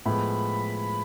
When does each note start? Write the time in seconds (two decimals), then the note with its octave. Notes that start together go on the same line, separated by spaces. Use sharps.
0.06 A2 F3 G#3 B3 B5